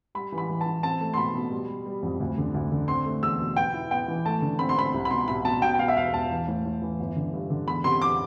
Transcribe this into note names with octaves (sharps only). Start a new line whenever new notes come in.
G3 B5
E3
B5
E3
A5
E3
C4 A5
A3
C6
B2 B5
B2
G3
G3
G3
F2
D2
D3
D2
D3
C4 C6
A3
E2 E6
B2
B3 G5
E4
B3 G5
E3
A3 A5
D3
C4 B5
C6
C4 B5
C2
B5
B2 C6
C2 B5
B2 A5
B2 G5
G5
B2 F5
E5
E1 F5
E1 A5
E3
A2
A2
E3
G1
D3
G2
D3
E2 B5
C3 C6
D6